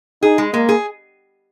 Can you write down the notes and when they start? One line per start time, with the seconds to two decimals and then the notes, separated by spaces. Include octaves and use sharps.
0.23 D#4 G#4
0.38 G#3
0.53 G#3 A#3
0.69 G#4